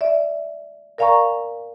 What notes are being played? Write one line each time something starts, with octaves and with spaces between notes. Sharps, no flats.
D5 E5
A#4 D5 F5 G#5 A#5 C#6